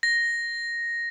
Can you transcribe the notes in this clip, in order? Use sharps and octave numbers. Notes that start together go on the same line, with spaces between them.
A#6